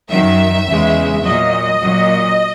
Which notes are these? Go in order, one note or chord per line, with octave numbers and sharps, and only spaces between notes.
F#2 D#3 F#3 E5
E2 C#3 G#3
A#2 F#3 D#5
A#2 F#3